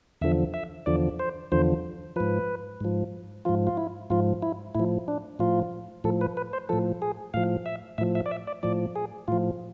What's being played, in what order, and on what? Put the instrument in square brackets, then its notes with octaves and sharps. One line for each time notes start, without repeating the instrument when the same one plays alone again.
[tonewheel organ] E2 D3 F3 E5
E5
E2 D3 F3 D5
C5
E2 D3 F3 C5
G#2 F3 B4
G#2 F3
G#2 F3 F4
F4
E4
G#2 F3 F4
E4
A2 F3 E4
D4
A2 F3 F4
A2 F3 A4
B4
B4
C5
A2 F3 A4
G#4
A2 F3 F5
E5
A2 F3 E5
E5
D5
E5
D5
A2 F3 D5
G#4
A2 F3 F4